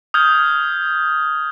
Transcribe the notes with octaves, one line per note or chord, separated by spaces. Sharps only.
D#6 F6 G6 G#6